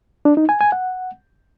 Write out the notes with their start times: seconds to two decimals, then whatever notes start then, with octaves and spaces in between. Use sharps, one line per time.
0.25 D4
0.37 D#4
0.49 G#5
0.61 G#5
0.72 F#5